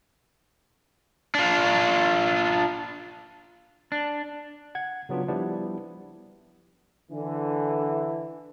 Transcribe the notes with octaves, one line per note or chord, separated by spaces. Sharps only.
D4 F4
D4
F#5 G#6
C#3 F#3 B3 D4 F4
F3 G3 B3 D4 E4
D3 E3